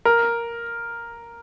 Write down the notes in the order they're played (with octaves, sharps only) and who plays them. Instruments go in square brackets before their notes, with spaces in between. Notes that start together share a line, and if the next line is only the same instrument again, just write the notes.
[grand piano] A#4